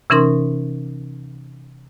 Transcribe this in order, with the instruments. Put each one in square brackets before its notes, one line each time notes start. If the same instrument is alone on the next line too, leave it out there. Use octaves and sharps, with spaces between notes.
[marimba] C3 E3 C#4 D#4 A#4 C6